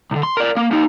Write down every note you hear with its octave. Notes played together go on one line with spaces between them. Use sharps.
C2 D3
C6
A#4 D5
A#3
A#3 D#4